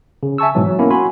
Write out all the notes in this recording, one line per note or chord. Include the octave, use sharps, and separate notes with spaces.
C#3
E5 G#5 A5 C#6 E6
G#2 B2 E3 F#3
F#3
A#3 B3 C#4 E4
F#4 G#5 B5 C6